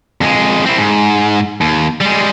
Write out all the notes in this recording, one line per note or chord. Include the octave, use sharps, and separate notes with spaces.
F2 G#3
C4 E4
G#2
D#2
G3 G#3